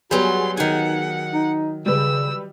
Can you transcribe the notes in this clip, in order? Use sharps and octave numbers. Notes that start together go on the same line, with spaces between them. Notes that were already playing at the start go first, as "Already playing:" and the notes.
F#3 G3 B3 F#4 G#4 C6
D#3 D#4 F#5 G#5
D#4
C#3 G3 B4 E6